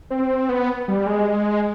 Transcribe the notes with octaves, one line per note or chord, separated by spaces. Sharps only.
C4
B3
G3
G#3